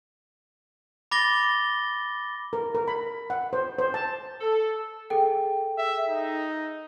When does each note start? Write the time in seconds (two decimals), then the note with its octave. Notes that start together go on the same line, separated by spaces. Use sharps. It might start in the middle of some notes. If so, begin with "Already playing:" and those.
1.11 B5 D6 A6 A#6 G7
2.53 A#4
2.75 A#4
2.88 B5
3.30 F#5
3.53 C5
3.79 C5
3.94 A5
4.41 A4
5.10 G#4 A4 G5
5.78 E5
6.09 D#4